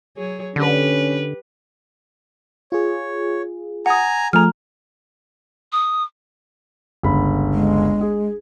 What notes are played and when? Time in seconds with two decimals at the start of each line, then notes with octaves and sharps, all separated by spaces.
0.17 F#3 G#4 C#5
0.56 D3 C#4 G4 B4
2.72 F4 G#4 C#5
3.86 F#5 G#5 A#5 D#6
4.33 F3 A3 G#4 A#5 F6
5.72 D#6
7.03 G1 C#2 B5
7.54 G#3
8.01 G#4